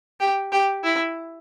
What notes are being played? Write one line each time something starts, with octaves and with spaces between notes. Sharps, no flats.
G4
G4
E4